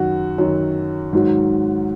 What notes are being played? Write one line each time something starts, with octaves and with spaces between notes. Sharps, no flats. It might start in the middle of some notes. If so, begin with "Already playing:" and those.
Already playing: F#2 D#3 F#3 F#4
F#2 D#3 F#3
G#2 D#3 F#3